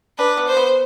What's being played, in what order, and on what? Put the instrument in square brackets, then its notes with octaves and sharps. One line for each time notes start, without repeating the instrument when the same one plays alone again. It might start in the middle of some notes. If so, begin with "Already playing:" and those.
[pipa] D4 [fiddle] B4
[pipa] B3
[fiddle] C5
[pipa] B3